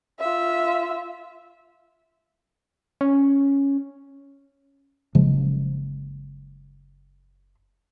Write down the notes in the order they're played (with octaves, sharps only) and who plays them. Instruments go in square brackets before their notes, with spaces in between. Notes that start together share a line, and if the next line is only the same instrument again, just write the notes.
[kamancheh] F4 E5
[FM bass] C#4
[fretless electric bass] F#1 C#3 F3 G#3